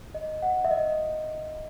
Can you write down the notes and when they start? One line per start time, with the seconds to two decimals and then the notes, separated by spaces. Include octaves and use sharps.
0.15 D#5
0.42 F#5
0.64 E5
0.71 D#5